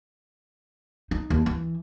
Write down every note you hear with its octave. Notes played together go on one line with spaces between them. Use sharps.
D#4
D#2
E3